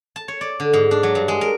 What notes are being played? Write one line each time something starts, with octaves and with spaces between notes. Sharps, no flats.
A5
C#5
D5
D3
G#2
D4
F#3
G2
G#3
A#4